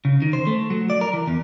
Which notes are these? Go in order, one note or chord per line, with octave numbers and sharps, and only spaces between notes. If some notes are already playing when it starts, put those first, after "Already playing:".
C#3
D#3
C5
A3
F#3
D5
A#4
E3
E2